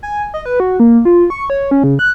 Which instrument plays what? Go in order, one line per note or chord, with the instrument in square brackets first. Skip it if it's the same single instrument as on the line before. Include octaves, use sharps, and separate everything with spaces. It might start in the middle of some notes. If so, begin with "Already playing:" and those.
[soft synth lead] G#5
D#5
B4
F#4
A#3
F4
C#6
C#5
C#4
C#3
F#6